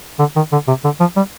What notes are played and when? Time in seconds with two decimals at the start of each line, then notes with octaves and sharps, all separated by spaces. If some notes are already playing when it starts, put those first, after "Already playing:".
0.19 D3
0.36 D#3
0.52 D3
0.68 C3
0.84 D3
1.00 F3
1.17 G3